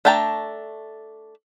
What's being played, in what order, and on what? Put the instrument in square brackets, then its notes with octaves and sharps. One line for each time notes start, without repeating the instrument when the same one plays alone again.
[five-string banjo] A3 D4 G5 A5 A#5